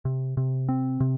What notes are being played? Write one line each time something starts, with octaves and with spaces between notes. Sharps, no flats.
C3
C3
C4
C3